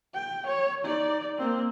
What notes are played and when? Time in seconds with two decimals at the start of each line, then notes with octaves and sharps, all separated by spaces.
0.15 G5
0.47 C#5
0.85 D#4 D5
1.38 A#3 C4